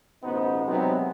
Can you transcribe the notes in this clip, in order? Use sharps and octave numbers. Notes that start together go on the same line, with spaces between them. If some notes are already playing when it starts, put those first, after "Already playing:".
A1 B2 B3 D#4 C5
C3 F#3 G#3 B3 C4 D#4